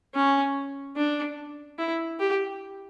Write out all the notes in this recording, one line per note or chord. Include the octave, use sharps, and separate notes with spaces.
C#4
D4
E4
G4